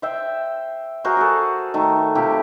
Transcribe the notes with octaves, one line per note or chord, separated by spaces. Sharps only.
C5 E5 G5
F#4 G#4 A#4 C5
F#4 G#4 A4
D#3 A3
C3 E4 F4 G4